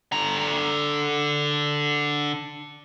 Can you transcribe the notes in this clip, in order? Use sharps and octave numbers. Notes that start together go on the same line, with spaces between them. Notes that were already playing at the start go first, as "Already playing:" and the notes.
D3 A#5